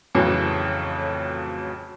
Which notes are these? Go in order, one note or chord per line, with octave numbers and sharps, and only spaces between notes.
F2 A2 C#3 E3 F#3